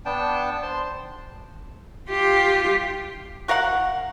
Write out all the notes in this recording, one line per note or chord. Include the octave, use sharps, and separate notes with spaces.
B3 D4 G5 A5
C5 A5 C6
F4 G4
F#4 A#4 F5 F#5